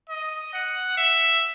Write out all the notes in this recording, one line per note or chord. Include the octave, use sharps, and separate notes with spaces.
D#5
F#5
E5